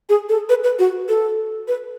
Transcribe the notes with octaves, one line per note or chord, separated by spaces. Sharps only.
G#4
A4
B4
B4
F#4
A4
B4